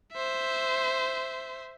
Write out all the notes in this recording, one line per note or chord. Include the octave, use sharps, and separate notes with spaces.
C5 E5